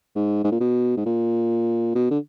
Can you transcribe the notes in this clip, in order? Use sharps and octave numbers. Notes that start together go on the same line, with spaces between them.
G#2
G#2
A#2
B2
G#2
A#2
B2
D3